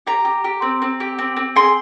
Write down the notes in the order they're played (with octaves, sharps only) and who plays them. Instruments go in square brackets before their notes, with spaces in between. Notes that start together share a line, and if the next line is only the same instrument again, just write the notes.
[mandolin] G4 A#5
G4
G4
C4
C4
G4
C4
C4
G#4 C6